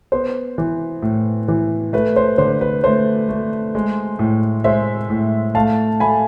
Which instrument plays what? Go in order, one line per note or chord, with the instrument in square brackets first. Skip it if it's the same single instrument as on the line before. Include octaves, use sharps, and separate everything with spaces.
[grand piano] B3 C5
E3
A2
E3
A3 B4
C5
D3 C5
B4
A3 C5
A3
G#3
A2
G#3 C5 E5
A2
A3 F5 A5
A3 G#5 B5